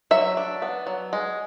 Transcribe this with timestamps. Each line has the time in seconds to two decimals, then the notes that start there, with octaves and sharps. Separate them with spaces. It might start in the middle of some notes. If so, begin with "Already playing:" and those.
0.11 F#3 E5
0.37 D4
0.62 B3
0.87 F#3
1.13 G#3